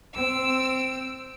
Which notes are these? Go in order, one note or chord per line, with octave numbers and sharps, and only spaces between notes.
C4 E6 D7